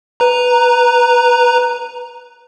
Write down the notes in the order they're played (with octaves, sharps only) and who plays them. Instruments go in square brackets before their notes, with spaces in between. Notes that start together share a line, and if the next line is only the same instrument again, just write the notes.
[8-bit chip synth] B4 A#5